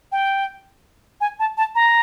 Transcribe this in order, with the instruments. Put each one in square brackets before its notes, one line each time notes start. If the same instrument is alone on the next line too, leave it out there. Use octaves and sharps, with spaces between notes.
[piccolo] G5
G#5
A5
A5
A#5